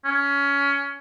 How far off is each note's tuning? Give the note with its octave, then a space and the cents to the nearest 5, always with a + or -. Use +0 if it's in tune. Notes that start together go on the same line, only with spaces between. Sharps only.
C#4 +20